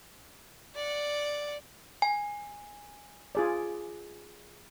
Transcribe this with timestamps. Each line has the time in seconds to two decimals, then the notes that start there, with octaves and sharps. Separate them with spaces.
0.75 D5 F#5
2.02 G#5
3.35 F4 G#4 D5